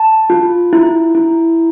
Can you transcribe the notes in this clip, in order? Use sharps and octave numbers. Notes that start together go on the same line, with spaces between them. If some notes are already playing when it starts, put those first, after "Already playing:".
Already playing: A5
F4
E4
E4